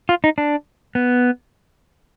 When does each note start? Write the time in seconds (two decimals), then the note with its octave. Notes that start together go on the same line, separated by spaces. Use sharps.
0.09 F4
0.24 D#4
0.38 D4
0.95 B3